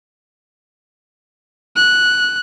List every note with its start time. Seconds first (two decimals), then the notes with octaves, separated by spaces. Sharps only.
1.76 F#6